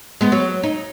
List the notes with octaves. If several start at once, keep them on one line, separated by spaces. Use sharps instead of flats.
G#3 B3
F#3
D#4